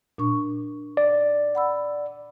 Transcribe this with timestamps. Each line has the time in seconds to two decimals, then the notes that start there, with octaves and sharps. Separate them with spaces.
0.18 A#2 D4 C#6
0.97 D5
1.55 F#5 B5 E6